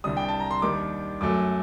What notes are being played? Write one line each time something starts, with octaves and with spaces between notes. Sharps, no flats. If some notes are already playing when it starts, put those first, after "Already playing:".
C2 C3 G3 D4 D#6
G5
A5
A#5
C6
D#2 D#3 G3 D4 D6
F#2 F#3 A3 D6